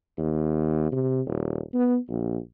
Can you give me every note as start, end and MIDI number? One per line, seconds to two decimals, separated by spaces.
0.18 0.92 39
0.92 1.21 48
1.27 1.60 27
1.74 1.97 59
2.09 2.37 34